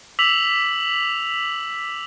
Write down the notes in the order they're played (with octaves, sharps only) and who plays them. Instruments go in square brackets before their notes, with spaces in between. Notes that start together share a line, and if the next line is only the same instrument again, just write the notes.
[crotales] D6 E6 B6 F7 F#7